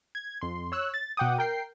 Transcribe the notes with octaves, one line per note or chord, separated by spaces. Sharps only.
G#6
F2 C6
C#5 E6 F#6
A6
B2 F#5 G5 D6 D#6
A#4 G5 C7